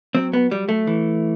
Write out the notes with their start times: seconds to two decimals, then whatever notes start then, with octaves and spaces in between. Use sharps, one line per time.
0.15 F#3 C4
0.33 B3
0.51 F#3 G3
0.69 A3
0.87 E3